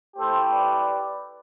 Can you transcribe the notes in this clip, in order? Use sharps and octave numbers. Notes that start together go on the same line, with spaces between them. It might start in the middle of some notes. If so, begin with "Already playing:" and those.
A3 E4 G4 A4 C5
B4 D5